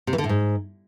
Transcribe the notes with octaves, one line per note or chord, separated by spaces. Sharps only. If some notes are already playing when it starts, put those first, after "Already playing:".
C3
E3
D3
A2
G#2